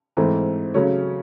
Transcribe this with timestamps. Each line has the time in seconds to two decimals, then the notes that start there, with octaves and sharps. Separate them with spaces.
0.17 G#2 E3 A3 C4
0.74 C#3 F#3 A3 C#4